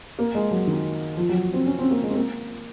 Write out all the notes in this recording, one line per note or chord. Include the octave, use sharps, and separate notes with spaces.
A#3
G#3
F#3
D#3
F3
F#3
C4
C#4
C4
A#3
G#3
C4
A#3